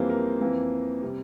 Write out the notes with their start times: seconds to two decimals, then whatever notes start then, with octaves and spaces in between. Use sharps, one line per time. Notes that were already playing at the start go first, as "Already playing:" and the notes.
Already playing: F2 E3 G3 A#3 C5
0.10 A#4
0.41 F2 E3 A#3
1.02 C3 G3